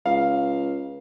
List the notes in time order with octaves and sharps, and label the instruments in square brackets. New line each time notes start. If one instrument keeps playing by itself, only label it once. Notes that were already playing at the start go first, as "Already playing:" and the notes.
[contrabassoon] C#2 [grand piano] F5